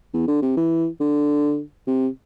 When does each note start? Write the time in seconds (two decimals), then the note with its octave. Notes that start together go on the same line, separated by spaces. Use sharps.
0.14 E2
0.28 D3
0.42 C3
0.57 E3
1.01 D3
1.87 C3